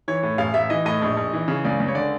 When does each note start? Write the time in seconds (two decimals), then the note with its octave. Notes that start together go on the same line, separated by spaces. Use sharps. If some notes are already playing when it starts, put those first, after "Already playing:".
0.08 E3 C#5
0.23 A2
0.38 A1 F5
0.54 A1 E5
0.70 E3 D#5
0.85 A2 D#5
1.02 A#1
1.17 A#1
1.33 E3
1.48 C#3
1.65 C#2 D5
1.80 C#2
1.88 C#5
1.95 D3 D5